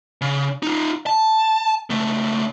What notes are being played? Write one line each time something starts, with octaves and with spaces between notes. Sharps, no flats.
C#3
D#4 F4
A5
C#2 A3